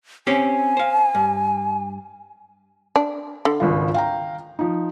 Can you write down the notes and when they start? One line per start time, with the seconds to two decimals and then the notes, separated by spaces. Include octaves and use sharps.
0.27 C4 C#4 G4 G#5
0.77 C5 F5
1.15 G2
2.96 D4
3.45 D3
3.60 G#1 C#2 F4
3.94 F5 G5 A#5
4.59 F3 D#4